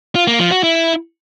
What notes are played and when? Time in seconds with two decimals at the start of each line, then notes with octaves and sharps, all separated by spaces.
0.15 F4
0.27 A#3
0.39 F3
0.51 F#4
0.63 E4